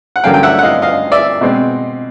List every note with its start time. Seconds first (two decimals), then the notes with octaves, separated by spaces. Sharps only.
0.16 F#5
0.24 G2 D3 F#3 A#3 C#4 F5 G5
0.34 G5
0.43 E5 F#5
0.59 F#5
0.63 D#5 F5
0.82 D#5 F5
1.12 D5 E5
1.41 B2 G#3 C4